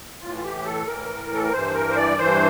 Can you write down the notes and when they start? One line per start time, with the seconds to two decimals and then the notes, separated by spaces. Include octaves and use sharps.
0.21 A2 E3 F4
0.37 F4
0.43 G4
0.64 A4
0.86 A2 E3 A#4
1.33 A4
1.43 A#4
1.52 G2 E3 C5
1.74 A#4
1.90 C5
1.97 D5
2.18 G2 E3 C5